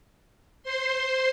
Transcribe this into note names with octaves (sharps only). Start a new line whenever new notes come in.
C5 C6